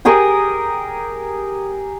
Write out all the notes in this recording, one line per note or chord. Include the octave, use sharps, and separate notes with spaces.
G4 G#4 A#4 D#6